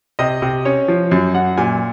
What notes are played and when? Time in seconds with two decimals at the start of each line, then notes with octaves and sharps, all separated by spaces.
0.19 C3 D#5
0.42 C3
0.65 C#4 C#5
0.88 F3
1.12 F#2
1.34 F#2 F#5
1.57 A#2 G#5